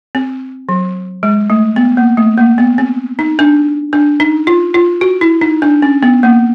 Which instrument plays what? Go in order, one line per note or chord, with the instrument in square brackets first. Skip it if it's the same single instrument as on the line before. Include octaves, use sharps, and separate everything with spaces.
[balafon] C4
F#3
G#3
A3
B3
A#3
A3
A#3
B3
C4
D#4
D4
D4
D#4
F4
F4
F#4
E4
D#4
D4
C#4
B3
A#3